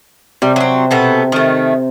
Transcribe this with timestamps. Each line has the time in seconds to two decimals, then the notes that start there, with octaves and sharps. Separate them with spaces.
0.42 C3 G3
0.56 F#3 C4
0.91 B2 B3 A4
1.32 D#3 A3